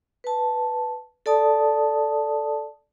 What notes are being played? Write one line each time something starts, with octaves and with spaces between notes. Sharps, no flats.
B4 A5
A4 D5 A5 D#6